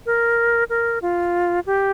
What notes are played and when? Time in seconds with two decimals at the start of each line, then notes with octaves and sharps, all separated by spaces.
0.06 A#4
0.70 A#4
1.02 F4
1.66 G4